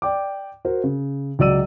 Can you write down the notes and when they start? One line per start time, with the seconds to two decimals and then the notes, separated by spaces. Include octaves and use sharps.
0.02 D5 G5 D6
0.65 F#4 A#4 C5
0.84 C#3
1.39 C#2 F#3 D5 E6 D#7